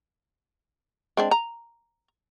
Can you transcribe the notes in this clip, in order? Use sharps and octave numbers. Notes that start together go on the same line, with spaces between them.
G#3 C4 D4
A#5